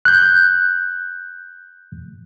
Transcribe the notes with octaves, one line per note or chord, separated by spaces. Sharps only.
F#6 G6